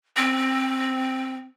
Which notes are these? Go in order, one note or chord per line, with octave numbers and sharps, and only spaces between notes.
C4